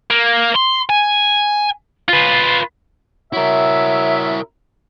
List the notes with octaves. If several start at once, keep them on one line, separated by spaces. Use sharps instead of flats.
A#3
C6
G#5
F4 B4
E4 F#4 A#4 C#5 E5